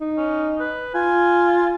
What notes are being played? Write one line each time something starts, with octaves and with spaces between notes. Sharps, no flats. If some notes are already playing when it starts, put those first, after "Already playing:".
D#4
C#4
B4
F4 G#5